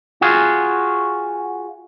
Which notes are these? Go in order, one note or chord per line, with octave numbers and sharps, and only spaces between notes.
F4 F#4 G#4